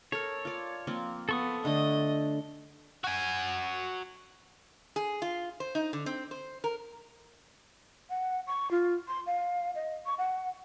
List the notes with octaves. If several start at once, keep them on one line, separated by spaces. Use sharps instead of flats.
A4 A#4 C#5
F4 D5
F3 A#3 C4
B3 A4 C#6 D#6
D3 A3 D4 D#5
F#4 G#5
G#4
F4
C5
D#4
D3
C4
C5
A#4
F#5
C#6
F4
C6
F5
D#5
C#6
F#5